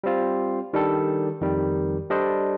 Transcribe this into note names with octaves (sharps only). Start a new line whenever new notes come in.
G3 C4 F4
D#3 G3 D4 A4
F2 D#3 G3
G3 D4 A4 C5 D#5